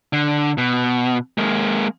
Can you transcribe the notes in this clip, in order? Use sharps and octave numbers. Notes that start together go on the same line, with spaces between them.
D3
B2
G#3 A#3